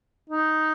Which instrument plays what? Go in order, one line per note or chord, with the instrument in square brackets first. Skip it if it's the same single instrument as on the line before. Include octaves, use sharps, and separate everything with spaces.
[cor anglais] D#4